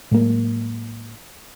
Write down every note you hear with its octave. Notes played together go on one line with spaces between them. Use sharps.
A2 F#3 G#3 A#3